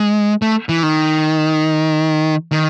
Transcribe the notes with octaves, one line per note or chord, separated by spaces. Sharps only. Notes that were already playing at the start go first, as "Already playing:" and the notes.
Already playing: G#3
A3
E3
D#3
D#3